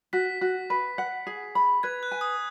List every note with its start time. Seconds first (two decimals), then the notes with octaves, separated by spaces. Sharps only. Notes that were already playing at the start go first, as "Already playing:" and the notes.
0.13 F#4 B6
0.41 F#4
0.70 B4
0.98 F#5
1.27 G#4
1.55 B5
1.83 B4 G#6
2.03 F#6
2.12 G#5
2.21 D#6